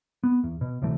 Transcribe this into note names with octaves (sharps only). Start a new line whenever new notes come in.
B3
E2
B2
D2 C3 E3 A3